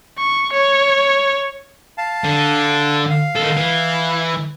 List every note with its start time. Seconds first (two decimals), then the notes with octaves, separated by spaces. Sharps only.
0.18 C#6
0.53 C#5
1.98 F5 A5
2.24 D3
3.10 F5
3.36 D#3 A4
3.57 E3